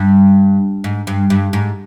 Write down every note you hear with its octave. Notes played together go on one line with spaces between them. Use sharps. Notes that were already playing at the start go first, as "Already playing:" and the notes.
Already playing: G2
G#2
G2
G2
G#2